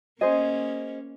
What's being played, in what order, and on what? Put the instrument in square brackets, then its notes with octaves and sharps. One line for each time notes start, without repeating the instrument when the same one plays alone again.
[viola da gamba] A#3 C#4 [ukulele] G#4 C5 D#5